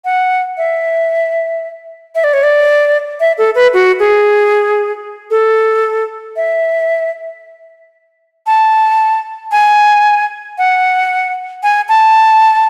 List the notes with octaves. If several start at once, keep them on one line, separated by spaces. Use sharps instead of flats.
F#5
E5
E5
D5
C#5
D5
E5
A4
B4
F#4
G#4
A4
E5
A5
G#5
F#5
G#5
A5